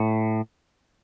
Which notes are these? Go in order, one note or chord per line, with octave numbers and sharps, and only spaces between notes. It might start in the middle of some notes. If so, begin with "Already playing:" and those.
Already playing: A2